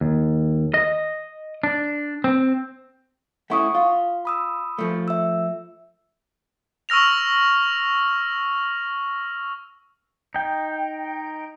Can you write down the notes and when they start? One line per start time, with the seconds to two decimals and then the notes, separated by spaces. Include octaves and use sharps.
0.01 D#2
0.74 D#5
1.63 D4
2.24 C4
3.50 A3 C#4 E4 F#5 C#6 D#6
3.75 F4 F5
4.25 B5 D#6 E6
4.78 F3 A3
5.08 E5 E6
6.89 C#6 E6 F6 A#6 F7
10.35 D#4 G5